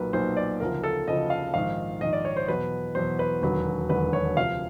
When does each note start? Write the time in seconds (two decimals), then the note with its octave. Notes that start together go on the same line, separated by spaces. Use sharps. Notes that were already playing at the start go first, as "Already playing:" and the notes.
Already playing: B1 A#2 F#3 A#4 B4
0.13 B1 A#2 F#3 C5
0.37 D5
0.60 D2 C#3 F3 A#4
0.84 A4
1.08 D2 C#3 F3 D#5
1.30 F5
1.54 A#1 G#2 D#3 F5
2.01 A#1 G#2 D#3 D#5
2.13 D5
2.25 C#5
2.37 C5
2.48 E2 B2 F#3 B4
2.95 E2 B2 F#3 C5
3.19 B4
3.42 E1 D#2 D3 F#3 B4
3.89 E1 D#2 D3 F#3 B4
4.13 C#5
4.37 D2 C3 F3 F5